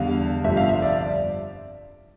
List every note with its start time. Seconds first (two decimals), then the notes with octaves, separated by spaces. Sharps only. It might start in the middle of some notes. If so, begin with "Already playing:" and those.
Already playing: E2 D3 G3 F5
0.44 G1 F2 C3 G3 E5
0.57 F5
0.69 E5
0.82 D5